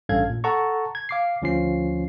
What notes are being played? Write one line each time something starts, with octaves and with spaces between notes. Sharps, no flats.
A1 G2 C#4 A4 F5 G#6
A#2
A4 F#5 A5 A#5 C#6
G#6
F5 D6 C7
D2 F3 C#4 F4 C7